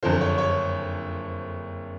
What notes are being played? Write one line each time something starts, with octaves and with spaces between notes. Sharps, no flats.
F#1 F2 D3 F3 C5
C#5
C#5